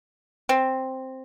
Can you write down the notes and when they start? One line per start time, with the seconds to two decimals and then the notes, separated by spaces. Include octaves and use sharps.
0.49 C4